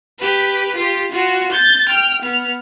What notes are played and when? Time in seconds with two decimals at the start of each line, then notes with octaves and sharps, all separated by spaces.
0.19 G4 B4
0.76 F4 G4
1.12 F4 F#4
1.52 G6 A6
1.89 G5 F6
2.22 B3 F6